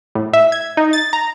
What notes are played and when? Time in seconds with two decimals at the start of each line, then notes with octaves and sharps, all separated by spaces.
0.15 A2
0.33 E5
0.52 G#6
0.77 D#4
0.93 A6
1.13 A#5